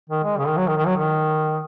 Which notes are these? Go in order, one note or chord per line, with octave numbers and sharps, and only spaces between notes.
D#3
G#3
C#3
D#3
F#3
D#3
D#3
F#3
D#3